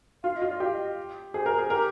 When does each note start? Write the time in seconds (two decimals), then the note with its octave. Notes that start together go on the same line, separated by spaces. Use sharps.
0.23 F4 F5
0.36 D#5
0.42 F4
0.49 D5
0.55 D#5
0.60 G4 F5
0.73 D#5
1.34 G#4 C5
1.46 A#4
1.58 G#4
1.70 G4 A#4